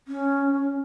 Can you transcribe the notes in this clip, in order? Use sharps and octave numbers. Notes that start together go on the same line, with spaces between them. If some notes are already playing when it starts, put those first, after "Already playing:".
C#4